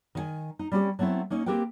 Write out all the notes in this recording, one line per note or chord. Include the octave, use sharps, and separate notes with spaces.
D#3 E5 G#5
D#4
G3 C4 C#4 F#4 G4
F#3 A3 B3 C4 E4
A#3 C#4 D#4
A#3 C4 G4 A#4 B4 G5